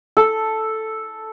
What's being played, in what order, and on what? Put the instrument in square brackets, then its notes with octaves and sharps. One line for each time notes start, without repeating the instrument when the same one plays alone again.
[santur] A4